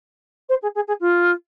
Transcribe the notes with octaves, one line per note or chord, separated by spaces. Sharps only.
C5
G#4
G#4
G#4
F4